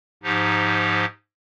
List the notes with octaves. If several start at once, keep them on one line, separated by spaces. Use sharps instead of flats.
G#2 F3 D#4 G4